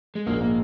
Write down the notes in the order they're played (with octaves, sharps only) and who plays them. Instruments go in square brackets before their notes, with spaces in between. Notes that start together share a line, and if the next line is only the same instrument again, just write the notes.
[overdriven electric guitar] G#3
[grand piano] A#1 G#2 G#3 D#4 [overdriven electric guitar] A#3
[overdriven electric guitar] A#3